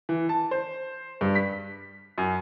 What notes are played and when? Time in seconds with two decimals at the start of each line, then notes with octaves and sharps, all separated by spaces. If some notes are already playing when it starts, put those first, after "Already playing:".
0.09 E3
0.29 A5
0.51 C5
1.21 G2
1.35 B6
2.18 F#2